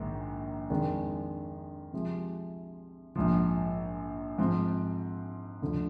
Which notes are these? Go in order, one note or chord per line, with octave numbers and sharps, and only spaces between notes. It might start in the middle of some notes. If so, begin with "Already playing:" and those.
Already playing: A#1 G#2 D#3
F2 D#3 G#3 D4
C3 F3 G#3
A#1 G#2 F3
G#2 F3 C4
D2 D3 F3